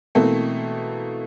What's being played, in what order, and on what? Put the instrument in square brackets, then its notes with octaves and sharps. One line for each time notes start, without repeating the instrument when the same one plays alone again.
[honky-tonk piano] B2 E3 A3 A#3 C4 A4